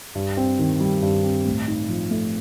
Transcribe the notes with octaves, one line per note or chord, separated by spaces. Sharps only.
G2
C4
D#3
G3
G2
C4
A2
D#4
F3
A3